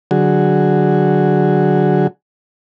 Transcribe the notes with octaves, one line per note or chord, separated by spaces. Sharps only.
D3 F#3 F#4 G#4